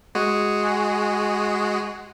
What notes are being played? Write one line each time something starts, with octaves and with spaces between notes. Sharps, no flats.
G#3 F#4 G#4